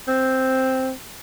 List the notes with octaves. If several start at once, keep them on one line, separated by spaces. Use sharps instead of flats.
C4